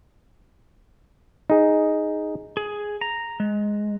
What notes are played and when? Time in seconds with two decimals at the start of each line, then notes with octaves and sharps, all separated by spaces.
1.50 D#4 G#4
2.57 G#4
3.01 A#5
3.40 G#3